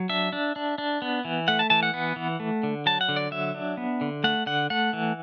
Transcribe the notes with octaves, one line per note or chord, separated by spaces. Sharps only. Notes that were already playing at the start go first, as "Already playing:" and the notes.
Already playing: F#3
D4 E5
D4
D4
D4
B3
E3
A3 F#5
A5
E3 A5
F#5
B3
E3
A3
D3
F#3 A5
F#5
D3
D5
F#3 E5
D4
B3
D3
A3 F#5
D3 F#5
A3 F#5
E3